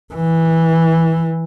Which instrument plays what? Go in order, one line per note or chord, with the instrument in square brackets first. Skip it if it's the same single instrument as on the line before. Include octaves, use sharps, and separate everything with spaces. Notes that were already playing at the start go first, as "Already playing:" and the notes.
[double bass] E3